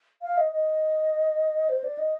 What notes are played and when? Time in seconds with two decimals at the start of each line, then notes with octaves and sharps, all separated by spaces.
0.22 F5
0.37 D#5
0.52 D#5
1.69 C5
1.84 D5
1.98 D#5